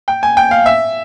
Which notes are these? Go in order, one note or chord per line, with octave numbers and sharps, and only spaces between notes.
G5
G#5
G5
F5
E5